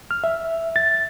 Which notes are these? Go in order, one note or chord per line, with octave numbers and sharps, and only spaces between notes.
F6
E5
A6